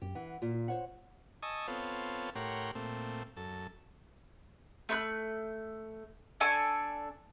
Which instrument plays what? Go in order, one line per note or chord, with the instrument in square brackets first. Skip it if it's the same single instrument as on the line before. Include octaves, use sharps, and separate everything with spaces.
[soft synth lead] F#2 [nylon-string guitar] G4
[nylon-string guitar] E3 [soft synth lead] F#5
[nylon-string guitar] A#2 [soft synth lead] F4
[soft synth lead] F4
[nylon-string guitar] C5 C#5 F#5
[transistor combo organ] D#5 G#5 A5 C#6 D#6 E6
B3 C4 F4 A4 C#5
A2 G4 A#4 C#5 F#5 C6
A#2 A3 C4
F#2 A4
[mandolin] A3 B5 F#6
D4 A4 G#5 C#6